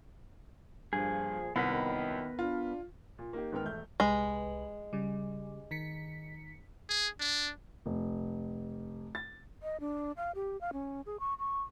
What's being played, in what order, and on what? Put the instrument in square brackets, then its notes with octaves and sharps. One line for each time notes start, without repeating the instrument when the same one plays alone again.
[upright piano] G2 [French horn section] A#2 F3 [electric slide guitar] G#4
[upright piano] C2 [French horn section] F#2 A#2 D#3 [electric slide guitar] B3 A#4 B4
[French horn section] D4 [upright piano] F4
[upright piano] A#2
A#3 D#4 G4
G#2 D#3 B3 A#4 G5 F6
E1 A3 G6
[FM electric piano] C2 B4 [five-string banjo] G#3
[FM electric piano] C#3 G3
D#3 B6 C#7
[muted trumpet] G#4
D4
[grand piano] F1
A6
[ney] D#5
D4
F5
G4
F5
C#4
G#4
C#6
C#6